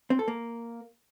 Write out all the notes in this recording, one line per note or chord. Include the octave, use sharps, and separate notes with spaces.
C4
A4
A#3